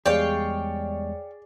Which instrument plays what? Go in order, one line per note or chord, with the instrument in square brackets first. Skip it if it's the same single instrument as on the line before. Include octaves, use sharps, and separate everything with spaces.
[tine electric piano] E2 G3 G#3 [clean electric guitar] G#4 [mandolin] C#5 F5 G5 [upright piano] D5